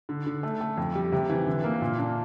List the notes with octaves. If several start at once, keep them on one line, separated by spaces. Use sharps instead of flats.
D3
D3
A3
A3
F2
G3
C3
E3
D3
A#3
A#2
D4